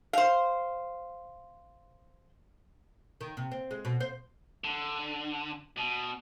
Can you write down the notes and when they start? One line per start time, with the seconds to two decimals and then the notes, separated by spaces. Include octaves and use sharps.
0.13 C5 F5
3.21 D#3
3.37 C3
3.51 C4
3.71 G#3
3.85 B2
4.00 C5
4.64 D3
5.77 B2